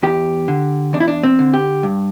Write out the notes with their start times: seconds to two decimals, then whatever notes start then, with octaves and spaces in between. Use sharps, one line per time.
0.03 E2 G4
0.48 D3
0.93 E2 D4
1.00 E4
1.08 D4
1.23 C4
1.39 D3
1.54 G4
1.83 G2